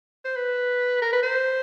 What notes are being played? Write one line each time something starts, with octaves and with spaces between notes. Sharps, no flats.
C5
B4
A#4
B4
C5